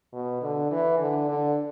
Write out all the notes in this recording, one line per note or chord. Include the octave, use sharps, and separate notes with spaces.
B2
D3
E3
D3
D3